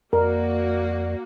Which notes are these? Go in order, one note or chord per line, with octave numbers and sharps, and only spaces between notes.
F2 A#3 F#4 A#4 D5